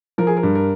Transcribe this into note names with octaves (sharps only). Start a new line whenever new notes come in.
F3 A#4
G#4
A#4
G2
A#4